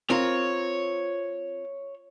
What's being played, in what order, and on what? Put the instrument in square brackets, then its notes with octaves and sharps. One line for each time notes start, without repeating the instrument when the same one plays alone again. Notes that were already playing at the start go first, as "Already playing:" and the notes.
[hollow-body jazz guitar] C4 F4 A#4 [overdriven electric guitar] C#5